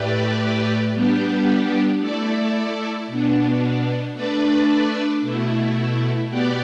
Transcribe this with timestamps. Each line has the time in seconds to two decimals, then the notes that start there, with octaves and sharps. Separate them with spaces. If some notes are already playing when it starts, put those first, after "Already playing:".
Already playing: A2 A3 G4 B4 D5
0.93 G3 B3 D4 G4
2.01 A3 E4 A4 D5
3.08 B2 B3 D4
4.14 A3 D4 B4 D5
5.22 B2 A3 E4
6.28 B2 B3 G4 B4 D5